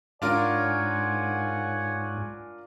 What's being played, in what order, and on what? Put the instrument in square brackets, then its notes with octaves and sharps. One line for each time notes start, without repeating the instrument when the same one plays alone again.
[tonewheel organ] G#2 [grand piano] D4 F4 A#4 [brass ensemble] C#5 F#5 G#5